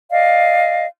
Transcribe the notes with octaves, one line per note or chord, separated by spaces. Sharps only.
D5 D#5 F5